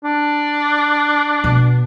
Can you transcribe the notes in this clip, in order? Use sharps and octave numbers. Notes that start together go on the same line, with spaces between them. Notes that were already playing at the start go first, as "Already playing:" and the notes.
D4
B2